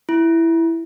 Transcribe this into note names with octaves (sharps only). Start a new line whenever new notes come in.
E4